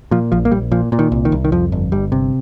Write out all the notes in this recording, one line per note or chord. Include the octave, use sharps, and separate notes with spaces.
A#2 F3
A#1 F3
A#3
A#1 G3
A#2 F3
A#2
D#3
C2
D#3
C2
D#3
F2 F3
G1
G1 G3
C3